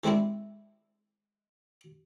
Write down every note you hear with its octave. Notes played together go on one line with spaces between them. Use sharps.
E3 G#3 C4 D4 E4